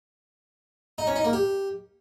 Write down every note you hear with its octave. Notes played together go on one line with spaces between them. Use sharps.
D#4
C#4
D#4
A#3
G4